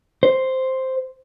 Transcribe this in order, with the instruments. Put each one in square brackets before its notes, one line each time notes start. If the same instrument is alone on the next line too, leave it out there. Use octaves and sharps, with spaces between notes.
[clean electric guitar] C5